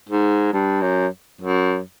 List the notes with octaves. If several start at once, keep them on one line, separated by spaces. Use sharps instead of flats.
G#2
G2
F#2
F#2